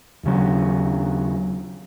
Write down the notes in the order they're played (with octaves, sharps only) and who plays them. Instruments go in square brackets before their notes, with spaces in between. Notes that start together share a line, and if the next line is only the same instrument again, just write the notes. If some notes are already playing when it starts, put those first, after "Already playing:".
[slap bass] D#2 C#3 F#3